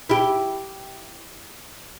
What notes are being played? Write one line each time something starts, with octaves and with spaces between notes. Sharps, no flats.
E4 G4